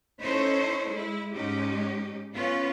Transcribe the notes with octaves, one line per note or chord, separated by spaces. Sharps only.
C#4 D#4 E4 A4 C5 C#5
G#3 E4
G#2 G#3 C#4 D#4 G4
B3 C#4 F4 B4